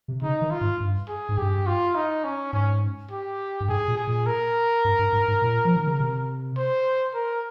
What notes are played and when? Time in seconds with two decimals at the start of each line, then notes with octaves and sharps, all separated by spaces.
0.08 C3
0.22 C#3 D#4
0.41 D#3
0.51 F4
0.61 G#2
0.80 G2
1.08 G#4
1.29 G#2
1.38 G2 G4
1.67 F4
1.95 D#4
2.24 C#4
2.53 G#2 C#4
3.11 G4
3.60 G2
3.69 G#2 G#4
3.88 A#2
3.97 G#4
4.07 A#2
4.26 A#4
4.85 G2
4.99 G2
5.12 G#2
5.28 G#2
5.42 A#2
5.65 F3
5.76 D#3
5.87 C#3
6.00 C3
6.57 C5
7.14 A#4